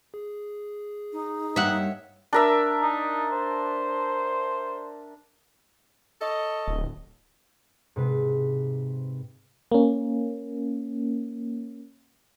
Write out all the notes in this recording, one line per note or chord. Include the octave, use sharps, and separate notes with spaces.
G#4
D#4
G2 D#3 A#3 C#5 E5 F#5 E6
D4 A#4 E5
D#4
C5
A4 C#5 D#5
D1
G#2 C3 B4
A#3 C#4